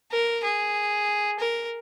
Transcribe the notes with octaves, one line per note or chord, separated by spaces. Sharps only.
A#4
G#4
A#4